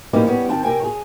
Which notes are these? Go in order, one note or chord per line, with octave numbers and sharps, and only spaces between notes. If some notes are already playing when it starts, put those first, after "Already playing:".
E3 G3 A#3 C4 C#4 D#4
G3 B3 C#4
D#3 C4 G5 A5
C3 A#4 G5 G#5
G#4 C#5